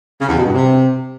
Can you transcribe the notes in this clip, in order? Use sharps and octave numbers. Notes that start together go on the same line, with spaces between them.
C#3
E2
B2
G2
C3